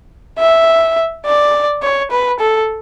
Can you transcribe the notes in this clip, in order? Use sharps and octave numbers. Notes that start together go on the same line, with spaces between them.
E5
D5
C#5
B4
A4